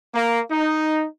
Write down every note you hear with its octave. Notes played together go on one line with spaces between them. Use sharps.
A#3
D#4